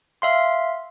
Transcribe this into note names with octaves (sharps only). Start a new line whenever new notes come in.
E5 F5 C6